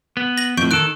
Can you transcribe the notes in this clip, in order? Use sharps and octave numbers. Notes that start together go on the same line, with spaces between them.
B3
A#6 F#7
F2 A2 C#6 G6 D7
D#3 A4 F#6 D7